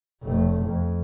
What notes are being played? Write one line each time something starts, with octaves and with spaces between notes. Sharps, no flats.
F1 A3
F2